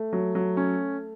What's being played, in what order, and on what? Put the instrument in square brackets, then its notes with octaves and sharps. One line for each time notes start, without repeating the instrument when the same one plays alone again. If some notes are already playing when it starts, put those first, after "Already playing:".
Already playing: [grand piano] A3
[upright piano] F#3
F#3
C#4